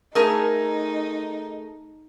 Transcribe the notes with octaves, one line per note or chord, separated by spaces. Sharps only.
A3 D#4 G#4 A#4